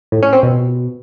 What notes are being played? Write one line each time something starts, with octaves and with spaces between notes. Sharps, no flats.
A2
C#4
C4
B2